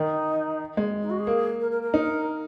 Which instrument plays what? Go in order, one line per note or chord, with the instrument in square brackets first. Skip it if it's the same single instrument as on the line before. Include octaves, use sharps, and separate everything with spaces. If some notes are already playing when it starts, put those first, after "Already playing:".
Already playing: [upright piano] D#3 [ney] D#4
[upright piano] G#3
[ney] D#4
F#4
G#4
[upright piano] A#3
[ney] A#4
A#4
A#4
[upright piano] D#4